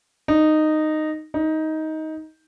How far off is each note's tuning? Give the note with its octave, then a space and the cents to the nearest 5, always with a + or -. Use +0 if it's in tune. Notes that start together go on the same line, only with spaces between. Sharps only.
D#4 -10
D#4 +15